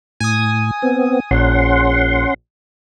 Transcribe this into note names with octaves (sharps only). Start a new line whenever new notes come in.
A2 G#5 D#6
B3 C4
A#1 C#4 F#5 C6